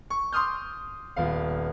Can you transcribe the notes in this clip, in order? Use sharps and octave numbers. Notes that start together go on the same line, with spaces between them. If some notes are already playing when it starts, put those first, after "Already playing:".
C#6
C6 D6 D#6 F6 G6
D#1 B3 F5